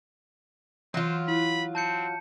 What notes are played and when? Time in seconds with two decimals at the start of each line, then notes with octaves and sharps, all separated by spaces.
0.94 E3 F#3 F4 C5
1.28 E4 B5
1.75 C4 A5 G6 C#7